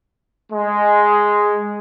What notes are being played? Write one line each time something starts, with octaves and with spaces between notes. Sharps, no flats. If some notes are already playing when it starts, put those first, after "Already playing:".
G#3